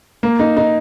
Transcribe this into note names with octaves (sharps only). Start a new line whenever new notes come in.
A#3
D#4
D#4